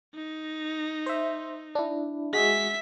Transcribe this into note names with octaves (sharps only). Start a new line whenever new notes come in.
D#4
C5 E5
D4 E4
G#3 F#4 G#4 E5 B6